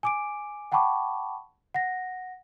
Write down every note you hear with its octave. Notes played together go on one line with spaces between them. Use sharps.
G#5 D6 D7
F#5 G5 A5 B5 C#6 D6
F#5 A#6